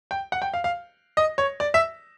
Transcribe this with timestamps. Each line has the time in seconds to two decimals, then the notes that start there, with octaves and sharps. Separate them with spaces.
0.11 G5
0.32 F#5
0.42 G5
0.54 F5
0.64 F5
1.17 D#5
1.38 C#5
1.60 D5
1.74 E5